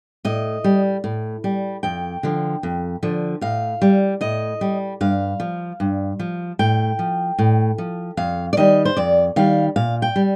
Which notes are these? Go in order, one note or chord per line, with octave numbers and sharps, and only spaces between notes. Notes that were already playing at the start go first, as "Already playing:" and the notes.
A2 D#5
G3
A2
G3
F2 G5
D3 F3
F2
D3 F3
A2 F5
G3
A2 D#5
G3
G2 F5
F3
G2
F3
A2 G5
F3
A2
F3
F2 F5
D5
D#3 G3 D#5
C5
F2 D5
D#3 G3 F5
A#2 F5
G5
G3